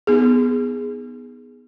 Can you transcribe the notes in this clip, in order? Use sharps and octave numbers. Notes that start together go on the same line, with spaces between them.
B3 D#4 G#4